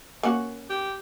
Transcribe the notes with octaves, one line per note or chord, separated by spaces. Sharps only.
A#3 C#4 F#4
G4